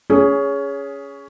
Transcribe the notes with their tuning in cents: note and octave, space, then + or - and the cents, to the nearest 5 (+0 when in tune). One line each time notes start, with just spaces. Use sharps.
C#4 +15 G#4 +0